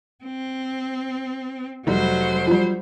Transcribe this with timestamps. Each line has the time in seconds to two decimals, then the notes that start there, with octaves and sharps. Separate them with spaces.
0.24 C4
1.87 F1 F#3 G3 C5
2.47 F3 G3